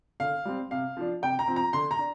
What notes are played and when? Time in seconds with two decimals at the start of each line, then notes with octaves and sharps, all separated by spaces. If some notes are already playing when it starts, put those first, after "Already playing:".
0.20 D3 F5
0.45 G3 C4
0.71 C3 F5
0.97 F3 D4
1.22 C3 G5
1.39 A#5
1.48 F3 C4
1.56 A#5
1.73 D3 C6
1.91 A#5
1.99 D4